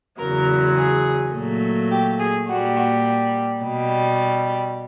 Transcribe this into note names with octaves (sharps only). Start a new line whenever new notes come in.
E2 C#3 F#3 A#4
G#4
A#2 F#3 A3
G4
G#4
A#2 G3 F#4
B2 G3